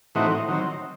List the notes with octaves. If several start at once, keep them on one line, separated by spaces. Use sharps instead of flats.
A2 E3 C4 D#4 F#4
D#3 F#3 C4